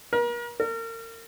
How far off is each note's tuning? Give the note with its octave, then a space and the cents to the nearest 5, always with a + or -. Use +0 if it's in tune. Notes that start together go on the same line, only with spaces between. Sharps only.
A#4 +40
A#4 -35